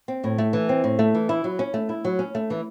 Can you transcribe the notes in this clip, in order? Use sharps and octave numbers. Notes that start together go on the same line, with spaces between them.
C4
A2
A3
E3
C4
A2
A3
E3
E4
F#3
C#4
A3
E4
F#3
C#4
A3
E3